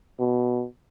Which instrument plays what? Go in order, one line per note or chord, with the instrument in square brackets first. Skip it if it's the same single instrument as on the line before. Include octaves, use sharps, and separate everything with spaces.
[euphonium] B2